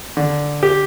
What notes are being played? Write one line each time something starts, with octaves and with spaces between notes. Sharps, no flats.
D3
G4